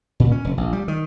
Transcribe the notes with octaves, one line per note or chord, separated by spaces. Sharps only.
A#2
C#4
F1
A#1
G3
D#3